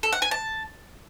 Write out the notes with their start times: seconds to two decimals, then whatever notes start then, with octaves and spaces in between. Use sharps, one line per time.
0.03 A4
0.13 F#5
0.22 G#5
0.31 A5